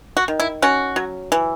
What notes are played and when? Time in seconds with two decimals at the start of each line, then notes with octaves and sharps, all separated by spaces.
0.17 F#4
0.28 D#3
0.40 E4
0.62 C#4 F#4
0.96 F#3
1.32 E3